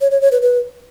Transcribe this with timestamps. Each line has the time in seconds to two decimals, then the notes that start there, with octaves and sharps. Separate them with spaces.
0.01 C#5
0.11 C#5
0.21 C#5
0.32 B4
0.42 B4